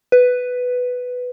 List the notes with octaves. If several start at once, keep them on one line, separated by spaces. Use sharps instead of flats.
B4